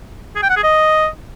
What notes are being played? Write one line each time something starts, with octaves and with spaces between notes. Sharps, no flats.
G#4
G5
F#5
G#4
D#5